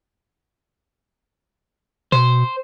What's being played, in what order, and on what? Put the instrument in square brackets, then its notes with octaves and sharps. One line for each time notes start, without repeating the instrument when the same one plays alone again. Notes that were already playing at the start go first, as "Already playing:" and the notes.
[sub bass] B2 [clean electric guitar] C5